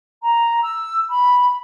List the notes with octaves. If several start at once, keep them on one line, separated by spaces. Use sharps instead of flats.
A#5
E6
B5